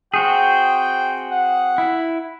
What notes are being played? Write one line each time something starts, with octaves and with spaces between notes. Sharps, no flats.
C4 F#4 G#4 G5
F#5
E4